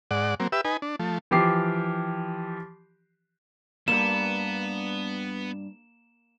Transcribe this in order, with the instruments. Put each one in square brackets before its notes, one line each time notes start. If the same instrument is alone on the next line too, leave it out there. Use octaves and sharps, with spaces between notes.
[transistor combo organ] G#2 D5 F#5
F#3 A#3 C4
G4 B4 E5 E6
D#4 B4 G#5
D4
F3 A3
[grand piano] E3 F3 G4 D6 C7
[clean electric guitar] E2 G2 [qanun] A#3 [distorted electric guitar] B3 [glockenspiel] E7